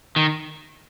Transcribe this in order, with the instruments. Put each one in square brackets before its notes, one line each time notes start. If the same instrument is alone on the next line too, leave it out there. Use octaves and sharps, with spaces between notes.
[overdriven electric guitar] D#3